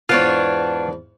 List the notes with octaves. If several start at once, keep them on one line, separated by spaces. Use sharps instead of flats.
E2 G#2 B3 D4 F4 C#5 A5